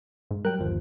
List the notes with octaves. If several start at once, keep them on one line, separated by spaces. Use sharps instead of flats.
G#2
F#3 G3 A#4 G5 F#6
G1 D#2 F3